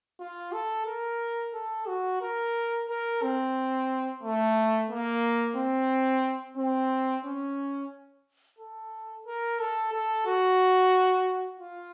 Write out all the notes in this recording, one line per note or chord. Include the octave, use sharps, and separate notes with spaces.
F4
A4
A#4
A4
F#4
A#4
A#4
C4
A3
A#3
C4
C4
C#4
A4
A#4
A4
A4
F#4
F4